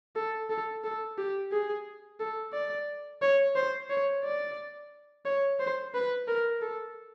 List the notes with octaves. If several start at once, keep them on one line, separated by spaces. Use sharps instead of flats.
A4
A4
A4
G4
G#4
A4
D5
C#5
C5
C#5
D5
C#5
C5
B4
A#4
A4